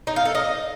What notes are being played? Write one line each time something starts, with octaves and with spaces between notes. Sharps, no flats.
D#4
F5
A4
D#5